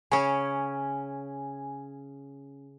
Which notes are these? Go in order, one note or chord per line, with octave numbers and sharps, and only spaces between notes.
C#3 C#4 G#5